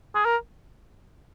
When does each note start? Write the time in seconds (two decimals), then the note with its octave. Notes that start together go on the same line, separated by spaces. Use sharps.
0.15 G#4
0.25 A#4